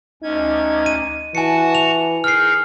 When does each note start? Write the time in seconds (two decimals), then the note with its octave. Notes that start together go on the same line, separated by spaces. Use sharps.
0.23 D2 C#4 D#4 G#6
0.86 D#7
1.35 E3 F#4 F#5 G#5 A5 C#7
1.75 F7
2.24 D#4 G#4 A#4 F6 C7